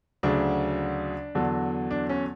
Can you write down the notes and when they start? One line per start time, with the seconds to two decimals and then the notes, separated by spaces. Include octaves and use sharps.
0.23 D2 C#3 F#3 D4
1.35 E2 D3 F#3
1.91 D4
2.09 C#4